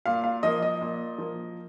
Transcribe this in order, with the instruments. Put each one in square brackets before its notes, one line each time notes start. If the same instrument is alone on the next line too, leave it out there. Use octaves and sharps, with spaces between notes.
[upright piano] A#2 F5
F5
F3 A#3 D#5
D#5
A#2
F3 A#3